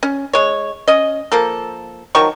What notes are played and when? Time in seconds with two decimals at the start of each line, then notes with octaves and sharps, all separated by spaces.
0.03 C#4
0.33 G#3 C#5
0.88 C#4 D#5
1.32 F3 A#3 A4
2.15 D#3 F3 F#3 C#6